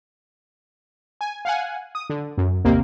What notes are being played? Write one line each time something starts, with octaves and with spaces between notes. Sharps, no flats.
G#5
F5 F#5 G#5
D#6
D3
F#2
A1 D#2 C3 D#3 A#3 C4